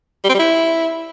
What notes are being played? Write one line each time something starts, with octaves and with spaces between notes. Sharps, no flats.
G3
C4
G3
E4